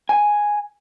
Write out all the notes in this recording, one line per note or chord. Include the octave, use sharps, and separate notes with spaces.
G#5